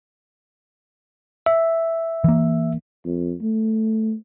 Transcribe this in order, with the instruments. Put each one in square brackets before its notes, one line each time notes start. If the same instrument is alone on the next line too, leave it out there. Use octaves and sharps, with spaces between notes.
[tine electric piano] E5
[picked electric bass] E3 A#3
[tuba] F2
A3